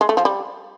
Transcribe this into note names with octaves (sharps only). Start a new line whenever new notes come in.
G#3
A3
F3
G3